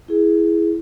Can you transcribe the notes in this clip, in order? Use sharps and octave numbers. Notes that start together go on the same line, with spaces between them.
E4 G#4